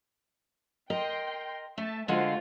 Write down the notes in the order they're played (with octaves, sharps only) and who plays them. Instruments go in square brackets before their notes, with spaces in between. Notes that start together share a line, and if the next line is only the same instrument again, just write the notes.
[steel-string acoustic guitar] A#4 D#5 [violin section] G5 C6
[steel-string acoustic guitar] A3 [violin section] E5 A5
[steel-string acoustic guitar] D3 G#3 F#5 [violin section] F4 F#4 C5